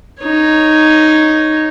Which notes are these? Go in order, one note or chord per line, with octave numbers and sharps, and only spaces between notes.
D#4 C#5